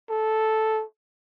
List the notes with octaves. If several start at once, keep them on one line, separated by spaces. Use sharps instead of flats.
A4